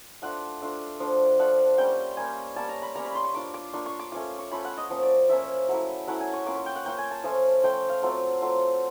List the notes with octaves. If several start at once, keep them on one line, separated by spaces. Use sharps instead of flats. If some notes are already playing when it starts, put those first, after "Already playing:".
A3 D4 F4 F#5
A3 D4 F4
F3 A3 D4 F4
F3 A3 D4 F4 F#5
G3 A#3 C#4 G5
G3 A#3 C#4 G#5
G3 A#3 C#4 A5
A#5
B5
G3 A#3 C#4 A#5
B5
C6
C#6
A#3 D4 F4 D6
D6
A#3 D4 F4 C#6
C#6
D6
A3 C#4 F4 D6
C#6
A3 C#4 F4 B5
F#5
D#5
F3 A#3 C#4
D5
F3 A#3 C#4 E5
F#3 A3 C#4 E4
F#3 A3 C#4 E4 F#5
G#5
C#6
A#3 C#4 F4 D6
C#6
G5
F#5
A#3 C#4 F4 G5
G#5
A5
F3 A3 C#4 F4 G#5
F3 A3 C#4 F4 G5
F5
F#3 A3 C4 F4
F#3 A3 C4 F4